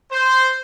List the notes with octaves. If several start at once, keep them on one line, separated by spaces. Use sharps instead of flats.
C5